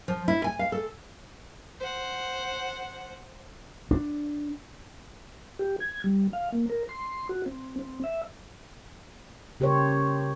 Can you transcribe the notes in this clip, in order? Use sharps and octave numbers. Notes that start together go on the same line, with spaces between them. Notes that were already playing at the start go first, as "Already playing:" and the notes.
F3
E4
G#5
F5
A4
C5 F#5
D4
G4
G#6
G3
F5
A#3
A#4
C6
F#4
C4
C4
E5
C#3 G4 A#4 C5 C#5